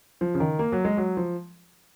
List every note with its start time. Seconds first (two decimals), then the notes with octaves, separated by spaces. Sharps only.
0.21 F3
0.34 C#3
0.40 D#3
0.59 A#3
0.72 F#3
0.85 G#3
0.97 F#3
1.17 F3